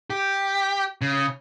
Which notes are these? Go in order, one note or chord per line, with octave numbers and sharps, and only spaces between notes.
G4
C#3